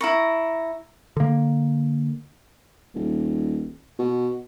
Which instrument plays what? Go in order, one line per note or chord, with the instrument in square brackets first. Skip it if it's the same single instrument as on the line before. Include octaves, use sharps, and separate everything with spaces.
[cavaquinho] E4 A#5 C#6
[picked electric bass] D3 A#3
[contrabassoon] D#1
B2